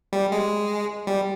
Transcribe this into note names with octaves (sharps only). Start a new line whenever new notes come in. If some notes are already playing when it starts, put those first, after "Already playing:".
G3
G#3
G3